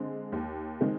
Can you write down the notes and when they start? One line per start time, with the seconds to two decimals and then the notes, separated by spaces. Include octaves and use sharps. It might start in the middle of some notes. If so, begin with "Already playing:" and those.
Already playing: D3 G#3 C4
0.32 D#2
0.80 D#3 G#3 C4